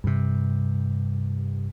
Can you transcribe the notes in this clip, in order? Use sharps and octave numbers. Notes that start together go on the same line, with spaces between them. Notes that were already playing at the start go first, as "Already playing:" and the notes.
G2 C3